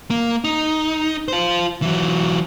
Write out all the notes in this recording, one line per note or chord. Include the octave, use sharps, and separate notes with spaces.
A#3
D#4
F4 C5
E3 F#3